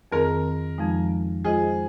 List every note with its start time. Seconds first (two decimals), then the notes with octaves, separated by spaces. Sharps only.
0.12 F2 D#3 C4 G#4 A#4
0.78 F2 F3 G#3 D#4
1.44 G#3 F4 G#4 C5 D#5